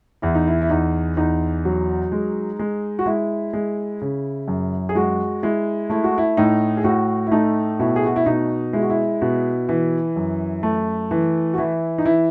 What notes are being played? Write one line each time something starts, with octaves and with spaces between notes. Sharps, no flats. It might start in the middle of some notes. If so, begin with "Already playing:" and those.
E2 E4
D#4
E4
E4
E2 D#4
E2 D#4
F#3
G#3
G#3
F#4
G#3 E4
G#3
C#3
F#2
G#4
G#3 F#4
G#3 E4
A3 E4
F#4
E4
A2 D#4
G#4
A2 F#4
E4
A3 D#4
B2 E4
G#4
F#4
E4
B2 D#4
G#3 E4
F#4
E4
B2
E3
F#2
A3
E3
F#4
E3 E4
D#4
E3 E4